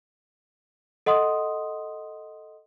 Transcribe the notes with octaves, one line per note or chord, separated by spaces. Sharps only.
A4 D#5 F#5 C6 D#6